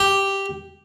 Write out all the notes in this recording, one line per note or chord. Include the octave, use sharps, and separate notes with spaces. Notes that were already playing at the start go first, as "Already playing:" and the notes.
Already playing: G4